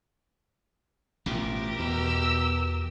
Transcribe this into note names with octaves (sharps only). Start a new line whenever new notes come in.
A1 B2 F3 G4 A#4
E2 B2 E6